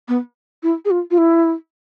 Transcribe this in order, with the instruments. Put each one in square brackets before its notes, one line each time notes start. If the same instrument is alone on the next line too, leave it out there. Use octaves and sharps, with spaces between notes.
[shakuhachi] B3
E4
G#4
F4
F4
E4